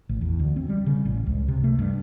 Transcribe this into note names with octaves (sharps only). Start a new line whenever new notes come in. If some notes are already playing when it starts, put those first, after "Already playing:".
A1
E2
D2
C4
G3
C#3
A1
C#2
C3
A3
G2